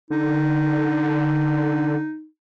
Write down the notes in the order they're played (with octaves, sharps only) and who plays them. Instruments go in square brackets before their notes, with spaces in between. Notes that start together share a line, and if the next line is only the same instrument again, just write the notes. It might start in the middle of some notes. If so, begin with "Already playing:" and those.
[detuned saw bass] D3 [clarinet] D#4